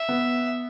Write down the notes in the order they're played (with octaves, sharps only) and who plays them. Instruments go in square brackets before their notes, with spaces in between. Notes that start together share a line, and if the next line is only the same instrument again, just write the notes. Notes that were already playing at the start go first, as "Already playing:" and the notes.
Already playing: [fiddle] E5
[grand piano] B3